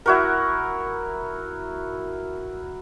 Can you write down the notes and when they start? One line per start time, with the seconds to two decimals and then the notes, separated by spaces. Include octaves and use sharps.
0.06 E4 F#4 A#4